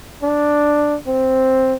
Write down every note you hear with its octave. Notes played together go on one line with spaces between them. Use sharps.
D4
C4